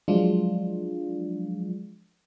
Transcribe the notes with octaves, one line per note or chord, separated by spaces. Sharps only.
F3 F#3 G#3 D4 F4